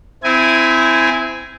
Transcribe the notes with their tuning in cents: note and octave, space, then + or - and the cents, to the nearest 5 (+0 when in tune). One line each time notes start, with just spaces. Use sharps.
C4 -20 E4 +0 G#5 +0